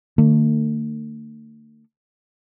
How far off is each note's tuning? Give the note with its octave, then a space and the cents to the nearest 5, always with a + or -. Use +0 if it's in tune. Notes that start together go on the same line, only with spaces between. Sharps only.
D3 +45 A3 +40